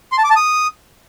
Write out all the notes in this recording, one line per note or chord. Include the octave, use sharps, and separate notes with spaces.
C6
A5
D6
A5
D#6